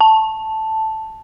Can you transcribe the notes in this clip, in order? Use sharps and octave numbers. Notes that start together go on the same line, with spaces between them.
A5